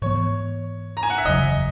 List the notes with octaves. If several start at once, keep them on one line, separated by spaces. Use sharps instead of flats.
G#2 E3 B3 C#5
A#5
G#5
F#5
E5
F#1 E2 C#3 F#3 D#5